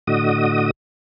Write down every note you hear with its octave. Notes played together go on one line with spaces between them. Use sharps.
A2 D3 F#4 D#5 D#6